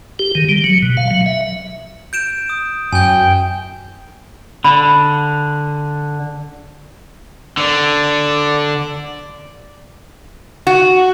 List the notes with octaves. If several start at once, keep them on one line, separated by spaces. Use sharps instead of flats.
G4
D#3
G3
F#3
B2
F5
F#3
E5
G6 D7 E7
D#6
F#2 G5 G#5 G6
D3 B5
D3 D5
F#4